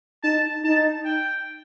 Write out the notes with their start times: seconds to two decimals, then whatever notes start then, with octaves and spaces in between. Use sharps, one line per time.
0.24 D#4 A5
0.64 D#4 A5
1.04 G5